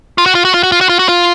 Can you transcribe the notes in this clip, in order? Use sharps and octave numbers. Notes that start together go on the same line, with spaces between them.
F4
F#4
F4
F#4
F4
F#4
F4
F#4
F4
F#4
F4